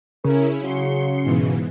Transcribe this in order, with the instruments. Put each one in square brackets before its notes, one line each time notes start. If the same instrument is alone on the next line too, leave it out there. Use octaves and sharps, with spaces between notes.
[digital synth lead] C#3 [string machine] C#4 E4 [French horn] A#4
[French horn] F#3 [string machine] C6 C#7
[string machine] G#2 B2 E3